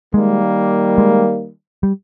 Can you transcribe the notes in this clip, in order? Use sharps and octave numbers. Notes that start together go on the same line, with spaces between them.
D#3 G3 G#3 A#3
G#3
G3